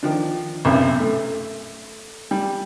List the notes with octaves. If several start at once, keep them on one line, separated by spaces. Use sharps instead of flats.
D#3 F3 D4
B1 F#2 C3
A3
G3